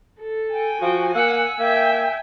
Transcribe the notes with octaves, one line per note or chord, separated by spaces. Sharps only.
A4
G5 G#5
F3 F#4 G5
A#3 F#5 E6
A#3 E5 G5 G#5